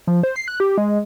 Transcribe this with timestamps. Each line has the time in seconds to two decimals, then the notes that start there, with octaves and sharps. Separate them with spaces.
0.07 F3
0.23 C5
0.36 C7
0.48 F#6
0.60 G4
0.78 G#3